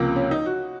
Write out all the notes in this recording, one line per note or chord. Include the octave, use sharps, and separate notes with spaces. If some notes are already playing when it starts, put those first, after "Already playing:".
Already playing: C#2 C3 F3 A#3
C#4
D#4
F#4